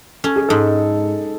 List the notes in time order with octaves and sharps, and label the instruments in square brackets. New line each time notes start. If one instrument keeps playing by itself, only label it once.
[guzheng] C#4 [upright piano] A4
[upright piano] G#4
[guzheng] G#2 [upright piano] A4